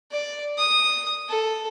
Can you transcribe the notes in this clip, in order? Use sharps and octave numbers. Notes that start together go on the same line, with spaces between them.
D5
D#6
A4